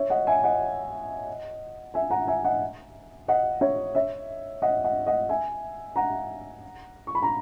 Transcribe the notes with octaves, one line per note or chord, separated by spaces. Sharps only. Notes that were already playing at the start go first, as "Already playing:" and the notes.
Already playing: C#5 E5
D#5 F#5
E5 G#5
D#5 F#5
E5 G#5
F#5 A#5
E5 G#5
D#5 F#5
D#5 F#5
C#5 E5
C#5 E5
D#5 F#5
D#5 F#5
D#5 F#5
E5 G#5
F#5 A#5
C#6
B5
A#5